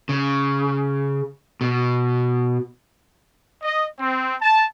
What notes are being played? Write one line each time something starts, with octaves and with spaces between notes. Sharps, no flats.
C#3
B2
D#5
C4
A5